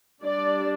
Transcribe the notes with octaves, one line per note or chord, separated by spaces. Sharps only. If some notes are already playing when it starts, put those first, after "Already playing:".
G3 D4 D5